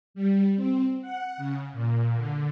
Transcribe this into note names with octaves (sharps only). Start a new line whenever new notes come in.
G3
C4
F#5
C#3
A#2
D3